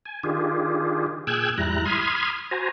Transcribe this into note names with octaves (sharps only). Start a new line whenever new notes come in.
G#5
D#3 D4 F4 G4 G#4
A#2 G#4 G5 E6 F#6 G#6
E2 G#2 G3 E4 A#5 F#6
B5 C6 D#6 F6 G#6
F#4 C5 G#5 A#5